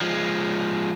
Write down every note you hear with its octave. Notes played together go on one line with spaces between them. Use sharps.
F3 G#3